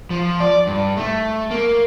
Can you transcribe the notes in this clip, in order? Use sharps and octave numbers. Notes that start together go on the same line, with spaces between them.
F3
D5
G2
A3
A#3